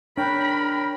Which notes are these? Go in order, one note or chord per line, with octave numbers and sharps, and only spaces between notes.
D4 A#4 C#5 G5 B5 F#6